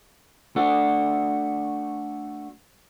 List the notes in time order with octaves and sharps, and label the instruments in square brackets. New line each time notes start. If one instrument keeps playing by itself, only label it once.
[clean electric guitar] A3 D4 F#4